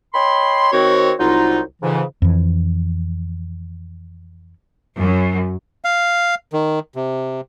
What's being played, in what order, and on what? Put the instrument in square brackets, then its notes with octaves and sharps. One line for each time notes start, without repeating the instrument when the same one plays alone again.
[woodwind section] C#5 D#5 G5 B5 C6
D#3 C4 F#4 C#5
C2 F#3 D#4 F4
F2 G#2 C#3 E3
[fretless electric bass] F2 E3
[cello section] F#2
[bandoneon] F5
D#3
C3